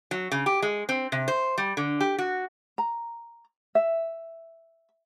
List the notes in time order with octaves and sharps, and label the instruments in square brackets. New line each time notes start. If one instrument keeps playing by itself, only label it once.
[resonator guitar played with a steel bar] F#3
C#3
G4
G#3
C4
C3
C5
G3
D3
G4
F#4
[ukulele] A#5
E5